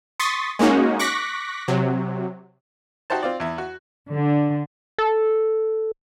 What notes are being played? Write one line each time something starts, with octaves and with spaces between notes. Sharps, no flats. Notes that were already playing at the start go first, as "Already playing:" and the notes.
C6 C#6 D#6 A6 B6
G#3 A#3 C#4 D#4 F#4
C#6 D6 F#6 A#6 B6
C3 F#3
D#4 F#4 G4 C5 A5
C4 F4 D5
E2 E4
F#4
D3
A4